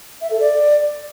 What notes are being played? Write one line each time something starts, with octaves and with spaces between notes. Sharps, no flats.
E5
A4
D5